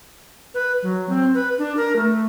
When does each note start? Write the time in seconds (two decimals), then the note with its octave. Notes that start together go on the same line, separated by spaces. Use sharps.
0.54 B4
0.83 F#3
1.09 C4
1.34 B4
1.58 D4
1.77 A#4
1.96 A3